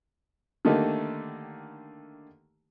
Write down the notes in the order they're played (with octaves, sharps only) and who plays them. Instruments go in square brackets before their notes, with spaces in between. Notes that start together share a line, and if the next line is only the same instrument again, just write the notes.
[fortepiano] D3 D#3 A3 A#3 D#4 G4